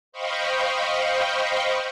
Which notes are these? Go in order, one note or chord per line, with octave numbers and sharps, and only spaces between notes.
C5 D#5 F5 G5 B5 C#6